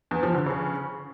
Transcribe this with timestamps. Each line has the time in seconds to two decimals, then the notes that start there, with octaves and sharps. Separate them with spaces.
0.11 E2
0.23 F3
0.35 D3
0.46 C#3